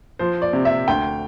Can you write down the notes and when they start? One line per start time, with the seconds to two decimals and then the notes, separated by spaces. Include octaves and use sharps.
0.19 F3 C5
0.42 D5
0.53 C3
0.65 E5
0.88 D2 G5